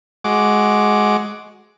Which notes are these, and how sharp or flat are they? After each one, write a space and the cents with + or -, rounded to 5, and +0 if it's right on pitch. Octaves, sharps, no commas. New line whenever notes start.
G#3 +10 F#4 +0 D6 +0